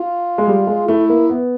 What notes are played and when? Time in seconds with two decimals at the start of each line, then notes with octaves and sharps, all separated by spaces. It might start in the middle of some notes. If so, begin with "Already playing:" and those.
Already playing: F4
0.38 G#3
0.48 G3
0.67 G#3
0.88 A3 E4
1.09 A#3
1.29 B3